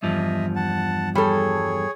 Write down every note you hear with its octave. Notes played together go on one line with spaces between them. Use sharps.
E2 G2 F3 D#5 E5
F#5 A5
G3 G#4 A4 C#5